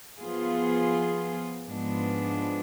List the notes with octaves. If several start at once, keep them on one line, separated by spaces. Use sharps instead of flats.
F3 B3 F4 G#4
G#2 F3 G#3 B3 D4